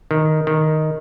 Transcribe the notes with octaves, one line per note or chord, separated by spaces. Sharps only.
D#3
D#3